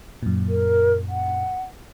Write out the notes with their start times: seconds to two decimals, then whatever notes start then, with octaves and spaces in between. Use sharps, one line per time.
0.23 F#2 A#2
0.48 A#4
1.09 F#5